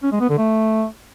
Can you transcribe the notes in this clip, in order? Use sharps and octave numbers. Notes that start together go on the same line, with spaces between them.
C#4
G#3
B3
D3
A3